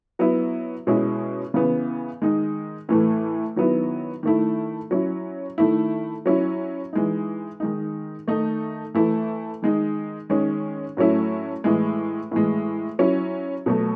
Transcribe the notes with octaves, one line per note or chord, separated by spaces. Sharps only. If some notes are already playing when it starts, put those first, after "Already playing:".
F#3 B3 E4
B2 G#3 C#4 E4
C#3 E3 B3
D#3 G#3 D#4
A2 E3 A3
D#3 F#3 B3 E4
D#3 A3 E4
F#3 C#4 E4
D#3 A3 E4
F#3 C#4 E4
E3 G#3 D#4
D#3 G#3 D#4
D#3 A3 D#4
E3 A3 E4
D#3 G#3 D#4
D#3 G#3 C#4
A2 F#3 A3 C#4 E4
A2 E3 G#3
A2 E3 G#3
F#3 C#4 E4
B2 F#3 A3